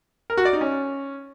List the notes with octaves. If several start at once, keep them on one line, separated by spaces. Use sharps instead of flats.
A#4
F#4
D5
D#4
C#4